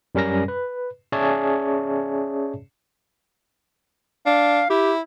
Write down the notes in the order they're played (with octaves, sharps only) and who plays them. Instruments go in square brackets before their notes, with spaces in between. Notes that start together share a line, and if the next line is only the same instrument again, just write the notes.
[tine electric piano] F#2 G3 C#4 A#4 A#6
B4
C#4 G#4 C#5 D5 E5 A5
[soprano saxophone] D4 [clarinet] F5
[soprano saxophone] E4 [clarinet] G4